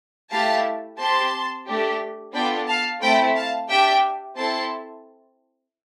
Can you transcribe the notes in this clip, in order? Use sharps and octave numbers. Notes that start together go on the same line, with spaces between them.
A3 E4 G4 F5 A5
C4 G4 A5 C6
A3 D4 G4
B3 D4 F4 A4 G5 B5
F5 A5
A3 C4 E4 G5 B5
F5 A5
D4 G4 E5 G5
C4 E4 A4 A5 C6